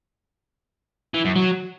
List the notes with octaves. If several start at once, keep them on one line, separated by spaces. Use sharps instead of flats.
E3
F#2
F#3